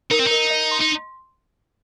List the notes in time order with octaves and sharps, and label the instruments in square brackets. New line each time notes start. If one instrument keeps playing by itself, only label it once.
[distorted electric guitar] D#4 [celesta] A#4
[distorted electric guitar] C4
[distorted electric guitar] D#4 [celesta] A#4
[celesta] D#5
C6
[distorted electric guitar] D#4